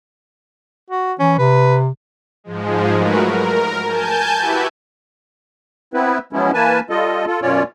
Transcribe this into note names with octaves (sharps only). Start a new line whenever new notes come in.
F#4
E3 C#4
C3 B4
G#2 F3 G#3
F#3 A3 F#4 A#4 B4
A#4
G#5 A5 G6
E4 F#4 G4 B4 E5
B3 C4 E4 B4
F3 F#3 G#3 B3 C#4 E4
E3 A#3 B4 G#5 A5
G3 F4 A4 D#5
F4 A4
F#2 B2 C#4 F4 C#5 D5